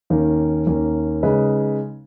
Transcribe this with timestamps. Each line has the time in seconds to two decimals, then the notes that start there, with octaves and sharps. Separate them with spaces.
0.10 D#2 D#3 A#3 C#4
0.67 D#2 D#3 A#3 C#4
1.23 C#3 G#3 D#4 G#4 B4